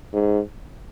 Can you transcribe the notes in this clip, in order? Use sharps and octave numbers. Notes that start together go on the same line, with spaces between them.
G#2